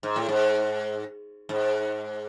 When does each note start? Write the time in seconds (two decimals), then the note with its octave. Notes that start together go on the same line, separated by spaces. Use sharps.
0.03 G#2
0.16 A2
0.29 G#2
1.49 G#2